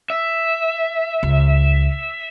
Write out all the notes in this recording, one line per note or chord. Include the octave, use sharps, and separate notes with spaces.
E5
C#2